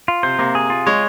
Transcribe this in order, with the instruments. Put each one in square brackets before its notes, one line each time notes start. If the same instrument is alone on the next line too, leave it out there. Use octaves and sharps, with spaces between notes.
[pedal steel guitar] F4
[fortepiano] C3 [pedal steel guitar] C5
[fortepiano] C3 [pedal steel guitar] A#3
[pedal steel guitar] G#4
F4
[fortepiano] G#3 [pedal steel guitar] C#5